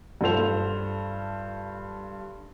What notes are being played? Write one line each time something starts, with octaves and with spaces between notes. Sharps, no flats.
G2 F4 A4 C5 F7